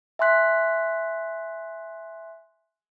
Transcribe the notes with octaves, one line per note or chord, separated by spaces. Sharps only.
E5 G#5 C6 F#6 B6